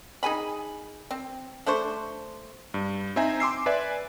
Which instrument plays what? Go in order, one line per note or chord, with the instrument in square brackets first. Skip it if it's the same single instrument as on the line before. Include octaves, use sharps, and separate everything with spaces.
[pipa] D#4 G#4 G#5 B5
C4
A3 D4 C5 C#6
[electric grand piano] G2
C4 D#4 C5 E5 G#5 A#5
C6 D6 E6 C7
B4 D5 E5 G#5